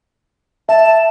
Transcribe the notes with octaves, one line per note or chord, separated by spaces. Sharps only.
E5 A5